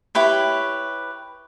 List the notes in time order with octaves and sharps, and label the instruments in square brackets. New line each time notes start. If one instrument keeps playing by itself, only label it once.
[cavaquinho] E4 G4 B4 C#5